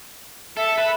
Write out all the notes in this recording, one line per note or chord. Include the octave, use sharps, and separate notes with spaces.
A4 E5
B4